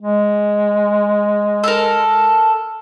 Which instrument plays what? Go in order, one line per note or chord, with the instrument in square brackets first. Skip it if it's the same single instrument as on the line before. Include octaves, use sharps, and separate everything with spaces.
[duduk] G#3
[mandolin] A4 A#4